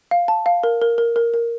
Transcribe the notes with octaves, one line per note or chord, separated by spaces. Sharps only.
F5
A5
F5
A#4
A#4
A#4
A#4
A#4